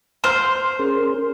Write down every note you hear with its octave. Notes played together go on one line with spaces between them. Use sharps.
C5 C6 F6
C#4 G#4 A#4